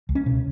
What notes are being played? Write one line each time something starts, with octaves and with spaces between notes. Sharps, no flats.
C#2
C#4
B2